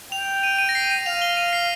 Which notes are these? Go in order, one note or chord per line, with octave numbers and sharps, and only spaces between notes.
G5 F7
D#7
D#7
A#6
C7
D#7
F5 F7
G7
D#7
C7